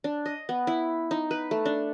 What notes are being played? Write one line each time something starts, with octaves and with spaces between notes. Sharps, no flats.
D4
D#5
B3
E4
D#4
B4
A3
D4